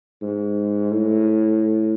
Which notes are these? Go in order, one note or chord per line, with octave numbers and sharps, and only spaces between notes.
G#2
A2